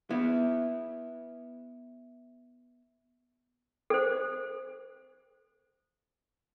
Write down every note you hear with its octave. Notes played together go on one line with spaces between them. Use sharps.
B3 E4
A4 C5